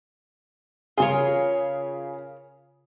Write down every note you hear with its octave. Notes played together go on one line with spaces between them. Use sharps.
C#3 F4 G#4 A#4 C#5